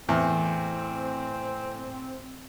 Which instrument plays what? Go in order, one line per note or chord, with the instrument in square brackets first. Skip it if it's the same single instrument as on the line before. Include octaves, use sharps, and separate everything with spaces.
[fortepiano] E2 [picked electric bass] A2 [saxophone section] C4